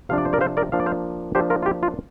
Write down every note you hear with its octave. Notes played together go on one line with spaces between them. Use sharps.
C3 F3 D4 F5
D5
C5
A#4 D5
C5 F5
A#4 D5
F3 A#3 D4 F5
D5
C5 F5
F3 A#3 D4 G4 C5
F4 A#4
F4
G4
F4